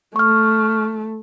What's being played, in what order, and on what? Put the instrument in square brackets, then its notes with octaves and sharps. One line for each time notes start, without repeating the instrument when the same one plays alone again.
[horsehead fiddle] A3 [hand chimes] C#6 F6